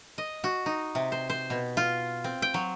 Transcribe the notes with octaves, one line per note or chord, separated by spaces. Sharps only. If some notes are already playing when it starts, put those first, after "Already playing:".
D#5
F#4
D#4
C3
C5
C5
B2
F4
C4
G5
F#3